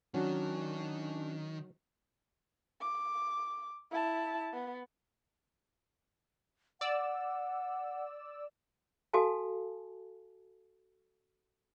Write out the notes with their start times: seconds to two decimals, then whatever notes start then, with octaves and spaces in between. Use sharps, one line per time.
0.14 D#3 F#3 C#4 D4 F#4
2.81 D6
3.91 E4 A5
4.53 B3
6.81 D5 F#5 E6
9.13 F#4 A4 F5 G#5 A5